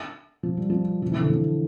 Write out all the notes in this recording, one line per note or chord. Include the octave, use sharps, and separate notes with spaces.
F3
G3
F3
F3
E3
D3
E3